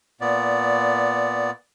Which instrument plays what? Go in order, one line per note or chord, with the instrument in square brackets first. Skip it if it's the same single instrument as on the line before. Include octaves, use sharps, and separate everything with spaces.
[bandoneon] A#2 B3 D5